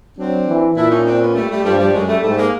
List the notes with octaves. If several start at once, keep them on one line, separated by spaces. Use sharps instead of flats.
F#3 C4 D4
E3
A#2 D4 E4
C#4 D#4
C4 D4
B3 C#4
G3 A3
G3 A3
G2 F3 G3
F3 G3
F#2 F#3 G#3
G3 A3
G#2 G3 A3
G#3 A#3